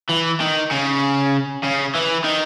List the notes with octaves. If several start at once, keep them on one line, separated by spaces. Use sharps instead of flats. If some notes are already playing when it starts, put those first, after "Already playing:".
E3
D#3
C#3
C#3
E3
D#3